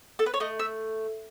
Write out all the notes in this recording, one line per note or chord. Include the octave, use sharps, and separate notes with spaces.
A4
B4
C#5
A3 D#5
E5